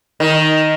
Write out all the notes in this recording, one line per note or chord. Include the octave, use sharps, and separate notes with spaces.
D#3